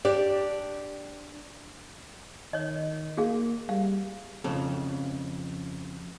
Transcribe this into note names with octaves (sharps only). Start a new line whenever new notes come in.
D4 G4 D5
D#3 C#5 D#5
A#3 F#4 G#4 F5
G3 F5
F2 C#3 A4